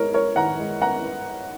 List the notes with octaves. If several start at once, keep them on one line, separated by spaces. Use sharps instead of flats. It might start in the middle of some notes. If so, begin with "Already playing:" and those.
Already playing: G#3 B3 A#4 C#5
G#3 A#4 C#5
D#3 F#5 A#5
G#3
B3 F#5 A#5
B3